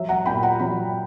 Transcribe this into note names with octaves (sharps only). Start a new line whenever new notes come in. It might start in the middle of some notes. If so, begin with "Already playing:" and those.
Already playing: F#3 E5
F#5 A#5
A#2 G5 B5
F#5 A#5
F#3 B5